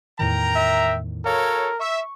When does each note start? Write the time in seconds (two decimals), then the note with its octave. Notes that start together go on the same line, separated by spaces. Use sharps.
0.19 E2 A2 D#3 A#4 G5 A#5
0.56 E5
1.25 F#4 A4 A#4 C#5 F5
1.80 E5 C#6